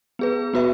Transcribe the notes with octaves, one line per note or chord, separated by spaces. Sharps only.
B3 G#4 B4
B3 F#4 B4 E5